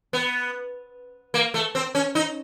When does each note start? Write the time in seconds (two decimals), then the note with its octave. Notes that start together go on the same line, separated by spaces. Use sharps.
0.13 B3
1.34 A#3
1.54 A3
1.75 C4
1.95 C#4
2.15 D#4